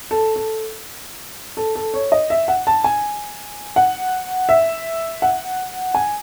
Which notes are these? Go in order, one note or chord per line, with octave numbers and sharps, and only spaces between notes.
A4
A4
A4
A4
C#5
D#5
E5
F#5
A5
G#5
F#5
E5
F#5
G#5